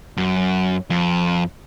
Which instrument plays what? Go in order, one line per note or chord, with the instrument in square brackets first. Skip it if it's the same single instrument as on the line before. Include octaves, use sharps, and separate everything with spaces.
[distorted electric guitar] F#2
F2